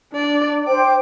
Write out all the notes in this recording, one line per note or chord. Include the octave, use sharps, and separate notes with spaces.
D4 D5
C5 G5 D6